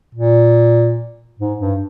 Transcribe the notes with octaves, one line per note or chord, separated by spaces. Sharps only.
A#2
G#2
G2